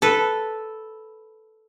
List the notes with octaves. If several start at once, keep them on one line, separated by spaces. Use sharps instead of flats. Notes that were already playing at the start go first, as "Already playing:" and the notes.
A4 B4